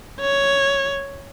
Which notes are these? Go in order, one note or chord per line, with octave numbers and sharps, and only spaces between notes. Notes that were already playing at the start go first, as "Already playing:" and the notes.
C#5